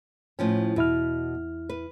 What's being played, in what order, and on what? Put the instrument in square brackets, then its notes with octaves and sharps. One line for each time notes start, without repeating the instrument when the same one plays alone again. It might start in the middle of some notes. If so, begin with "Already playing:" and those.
[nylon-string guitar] A2 F3 C#4
[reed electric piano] E2 E4 F6 [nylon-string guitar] B2
[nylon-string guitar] B4